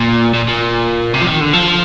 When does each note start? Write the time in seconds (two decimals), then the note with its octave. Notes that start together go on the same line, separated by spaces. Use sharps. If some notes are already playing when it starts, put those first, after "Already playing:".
Already playing: A#2
0.34 A#2
0.48 A#2
1.14 C3
1.22 F3
1.27 D#3
1.41 D3
1.53 F3